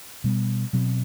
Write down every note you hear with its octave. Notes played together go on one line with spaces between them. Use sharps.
B2 G3 B3
B2 F#3 C4